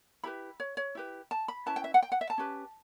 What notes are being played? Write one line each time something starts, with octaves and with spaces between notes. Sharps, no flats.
E4 G4 B4 B5
C#5
C#5
E4 G4 B4
A5
B5
C#4 E4 B4 A5
G5
E5
F#5
G5
F#5
E5
A5
C#4 G4 B4